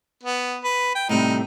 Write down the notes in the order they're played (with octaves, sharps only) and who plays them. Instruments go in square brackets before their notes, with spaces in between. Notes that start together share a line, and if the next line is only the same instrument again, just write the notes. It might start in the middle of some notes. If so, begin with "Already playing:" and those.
[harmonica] B3
B4
G5
[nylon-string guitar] A2 C3 G3 [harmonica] D#4